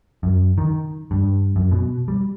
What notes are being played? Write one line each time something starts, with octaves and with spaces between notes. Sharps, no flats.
F#2
D#3
G2
F#2
B2
G3